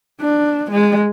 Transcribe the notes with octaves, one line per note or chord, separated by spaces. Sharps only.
D4
G#3